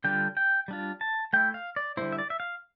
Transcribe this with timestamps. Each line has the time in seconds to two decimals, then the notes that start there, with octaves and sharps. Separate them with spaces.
0.04 D3 G3 D4 F4 G5
0.37 G5
0.68 G3 D4 F4
1.01 A5
1.33 A3 E4 G5
1.54 F5
1.76 D5
1.97 D3 G3 A#3 E4 C5
2.12 E5
2.19 D5
2.30 E5
2.40 F5